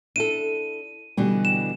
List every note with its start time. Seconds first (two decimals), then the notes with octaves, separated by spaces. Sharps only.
0.16 D4 E4 A4 D#7
1.17 B2 D3 E3 G3
1.45 E7